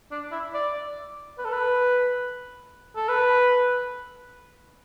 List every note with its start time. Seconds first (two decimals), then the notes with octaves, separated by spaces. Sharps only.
0.11 D4
0.32 E4
0.54 D5
1.38 B4
1.45 A4
1.53 B4
2.96 A4
3.08 B4